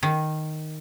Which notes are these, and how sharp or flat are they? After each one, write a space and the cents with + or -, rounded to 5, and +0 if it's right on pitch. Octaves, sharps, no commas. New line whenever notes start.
D#3 -5